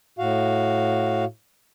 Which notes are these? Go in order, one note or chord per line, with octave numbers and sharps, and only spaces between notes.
A2 F#4 F5